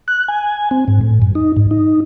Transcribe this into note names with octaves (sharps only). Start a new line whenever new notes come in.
F#6
G#5
C4
G#2
A2
F#2
D#4
G#2
D#4